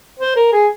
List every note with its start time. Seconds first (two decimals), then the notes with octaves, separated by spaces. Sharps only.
0.19 C5
0.36 A#4
0.52 G#4